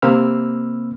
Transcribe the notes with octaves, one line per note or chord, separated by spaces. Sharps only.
C3 A#3 C4 B5 E6 F6